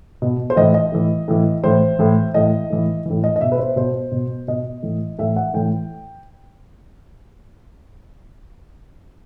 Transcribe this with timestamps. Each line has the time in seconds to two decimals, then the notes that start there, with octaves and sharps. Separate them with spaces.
0.22 B2
0.50 C5
0.56 A2 E3 D#5
0.74 D#5
0.92 A2 E3
1.28 A2 E3
1.64 A2 E3 C5
1.99 A2 E3
2.34 A2 E3 D#5
2.70 A2 E3
3.06 A2 E3
3.24 D#5
3.36 D#5
3.41 B2 E5
3.52 B4
3.59 C5
3.76 B2 C5
4.12 B2
4.47 B2 D#5
4.83 A2 E3
5.19 A2 E3 E5
5.36 F#5
5.54 A2 E3 G5